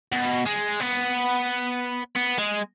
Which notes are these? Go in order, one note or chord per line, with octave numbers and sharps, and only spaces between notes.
B2
G#3
B3
B3
G#3